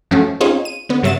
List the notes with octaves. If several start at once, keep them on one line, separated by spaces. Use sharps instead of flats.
F#2 F3 A3 C#4 F#4
C4 C#4 D#4 F4 G#4
D#7
D3 B3
G2 C#3 F#3 E5 A6 E7